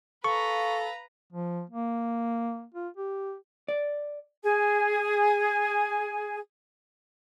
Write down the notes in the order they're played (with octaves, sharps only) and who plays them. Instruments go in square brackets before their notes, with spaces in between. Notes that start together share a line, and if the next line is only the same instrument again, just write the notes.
[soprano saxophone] A4 [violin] B4 A#5 [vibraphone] F5 [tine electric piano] C#6
[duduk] F3
A#3
F4
G4
[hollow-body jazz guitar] D5
[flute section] G#4 G#5